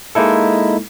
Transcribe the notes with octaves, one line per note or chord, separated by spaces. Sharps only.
G#3 A#3 D#4 E4 A4